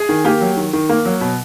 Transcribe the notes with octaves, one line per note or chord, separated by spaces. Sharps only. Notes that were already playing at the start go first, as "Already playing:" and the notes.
Already playing: G#4 G#5
D#3
A#3 G4 G5
F#3
D#3
D#3
A#3
F#3
B2